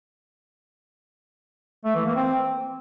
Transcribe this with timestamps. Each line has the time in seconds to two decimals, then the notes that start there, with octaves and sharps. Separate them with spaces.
1.85 A3
1.95 E3
2.05 A#3
2.16 C4